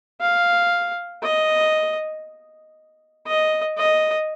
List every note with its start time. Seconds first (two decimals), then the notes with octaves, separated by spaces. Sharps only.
0.22 F5
1.23 D#5
3.27 D#5
3.78 D#5